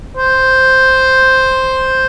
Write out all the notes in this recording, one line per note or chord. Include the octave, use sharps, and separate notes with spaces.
C5